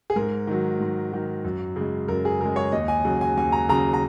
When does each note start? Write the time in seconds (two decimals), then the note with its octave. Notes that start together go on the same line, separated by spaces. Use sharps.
0.10 G#4
0.16 G#2 A#4
0.47 D#3 F#3
0.80 G#2
1.12 D#3 F#3
1.45 F#2
1.76 C#3 G#3
2.08 F#2 A#4
2.25 G#4
2.40 C#3 G#3 A#4
2.56 C#5
2.72 D#2 D#5
2.88 G#5
3.05 C#3 F#3
3.21 G#5
3.37 D#2 G#5
3.52 A#5
3.69 C#3 F#3 A#5
3.93 A#5